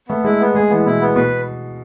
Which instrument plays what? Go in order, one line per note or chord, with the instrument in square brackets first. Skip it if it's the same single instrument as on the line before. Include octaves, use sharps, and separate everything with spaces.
[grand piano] A3 [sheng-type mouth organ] B3
[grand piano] G#3 [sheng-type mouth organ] E4
[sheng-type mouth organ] B3
[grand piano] G#3 [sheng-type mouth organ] G#4
[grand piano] E3 [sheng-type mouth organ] B3
[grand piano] B2 [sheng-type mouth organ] E4
[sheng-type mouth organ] B3
[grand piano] B2 [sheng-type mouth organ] B4